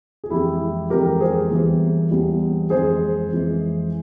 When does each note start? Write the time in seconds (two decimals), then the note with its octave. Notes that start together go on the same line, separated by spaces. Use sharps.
0.24 G#4
0.30 F2 E3 G#3 E4 G4
0.90 F2 E3 G#3 G4 A#4
1.20 G#4 C5
1.50 E2 E3 G3
2.11 E2 E3 G3
2.70 F2 E3 G#3 G#4 C5
3.30 F2 E3 G#3